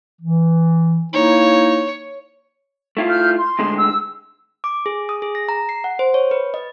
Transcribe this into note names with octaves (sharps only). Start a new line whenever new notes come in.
E3
A#3 D#4 E4 C#5
A3 E4 F4
F6 G6
C6
A2 D3 G#3
E6
D6
G#4
D#6
G#4
A#6
A#5
C7
F#5
C5
C#5
B4
D#5